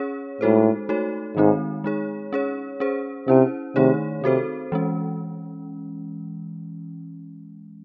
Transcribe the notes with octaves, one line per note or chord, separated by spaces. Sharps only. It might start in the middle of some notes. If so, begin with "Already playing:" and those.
Already playing: C#4 G#4 C#5
A2 G#3 D#4 F#4 A4 C5
A3 D#4 F#4 A4 C#5
G#2 D#3 G#3 C4 D#4
G#3 D#4 G#4 C#5
C#4 G#4 C#5
C#4 G#4 C5
C3 C#4 E4 C5
C3 D#3 A3 D#4 G#4 C#5
C3 C4 F#4 A4 C5
E3 G#3 C#4